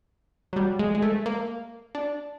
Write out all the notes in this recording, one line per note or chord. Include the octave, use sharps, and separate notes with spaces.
F#3
G3
G#3
G#3
A3
A#3
D4